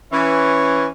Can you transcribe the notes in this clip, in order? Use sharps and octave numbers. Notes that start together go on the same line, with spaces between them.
E3 C#4